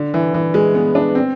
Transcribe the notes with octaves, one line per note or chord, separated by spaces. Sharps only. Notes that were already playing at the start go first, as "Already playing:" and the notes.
Already playing: D3
E3
E3
G#3
B3
D4
C4